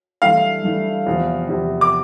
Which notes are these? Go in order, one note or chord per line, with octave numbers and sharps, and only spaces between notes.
G2 E3 A3 E4 F5
G2 E3 A3 E4
E2 C3 F3
E2 C3 F3
D6